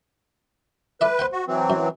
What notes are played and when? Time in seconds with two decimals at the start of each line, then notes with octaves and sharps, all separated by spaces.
1.01 A4 B4 D5 E5
1.19 C5 F#5 G5
1.33 F#4
1.47 E3 F#3 C4
1.70 F#2